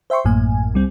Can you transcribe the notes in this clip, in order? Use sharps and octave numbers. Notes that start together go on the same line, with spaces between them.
C5 E5 G5 C6 C#6
A1 F#2 A2 A#3 G#5
C2 G3 C4